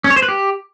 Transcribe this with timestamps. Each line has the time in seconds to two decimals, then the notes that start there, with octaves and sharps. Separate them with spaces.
0.04 C#4
0.10 C#5
0.16 C5
0.22 B4
0.28 G4